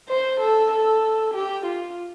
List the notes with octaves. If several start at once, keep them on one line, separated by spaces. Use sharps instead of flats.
C5
A4
A4
G4
F4